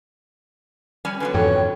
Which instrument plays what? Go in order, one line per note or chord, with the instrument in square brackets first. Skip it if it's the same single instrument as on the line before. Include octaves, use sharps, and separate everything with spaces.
[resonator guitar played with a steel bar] G3 C#4 G#5
[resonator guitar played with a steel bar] D3 F#3 B3 [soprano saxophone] B4
[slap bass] F2 G#2 E3 [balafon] A4 G5 [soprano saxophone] C#5